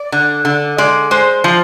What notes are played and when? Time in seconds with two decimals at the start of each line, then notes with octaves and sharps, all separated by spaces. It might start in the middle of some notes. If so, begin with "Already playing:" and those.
Already playing: D5
0.12 D3
0.45 D3
0.78 G#3 D5
1.11 G#3 C5
1.44 F3